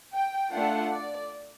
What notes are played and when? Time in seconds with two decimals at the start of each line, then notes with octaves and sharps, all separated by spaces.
0.12 G5
0.52 A3 D4 F4 A4 F#5
0.92 D5